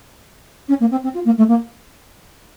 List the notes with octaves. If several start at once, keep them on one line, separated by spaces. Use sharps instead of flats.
C#4
A#3
C4
C4
F4
A#3
A3
A#3